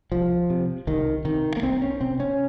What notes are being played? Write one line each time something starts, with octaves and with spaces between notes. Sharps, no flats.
C2 F3
C3
C2 D#3
C3 D#3
A#3
C2 C4
C#4
C3 C4
C#4